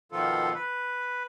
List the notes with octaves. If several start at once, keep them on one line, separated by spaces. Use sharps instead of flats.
B2 D#3 F3 F4 A4
B4